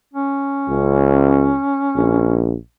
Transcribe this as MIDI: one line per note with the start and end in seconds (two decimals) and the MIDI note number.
0.13 2.47 61
0.69 1.56 37
1.96 2.56 34